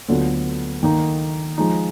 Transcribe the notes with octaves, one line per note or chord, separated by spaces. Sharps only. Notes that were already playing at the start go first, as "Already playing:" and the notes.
D2 D3 F#3 B3 F4
D#3 A#3 D#4
F3 G#3 D#4